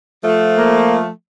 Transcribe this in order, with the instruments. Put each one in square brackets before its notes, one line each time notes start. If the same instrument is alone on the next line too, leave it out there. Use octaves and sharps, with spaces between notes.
[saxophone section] F3 A3
[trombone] A#3